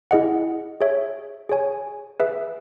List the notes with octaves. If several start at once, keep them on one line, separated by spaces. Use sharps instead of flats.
E4 G#4 D#5 F#5
G#4 C#5 E5
G#4 C#5 G#5
G#4 B4 E5